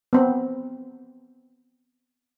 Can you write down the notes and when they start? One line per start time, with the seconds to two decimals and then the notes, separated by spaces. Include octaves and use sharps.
0.13 B3 C4